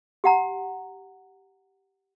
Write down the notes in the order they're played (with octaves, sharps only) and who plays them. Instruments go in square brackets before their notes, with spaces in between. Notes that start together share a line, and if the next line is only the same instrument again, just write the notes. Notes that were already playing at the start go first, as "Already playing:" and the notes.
[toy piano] G4 F#5 A#5